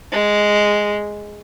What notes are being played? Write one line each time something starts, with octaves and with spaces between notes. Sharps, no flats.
G#3